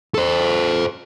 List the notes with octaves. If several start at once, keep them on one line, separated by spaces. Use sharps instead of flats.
A4 C5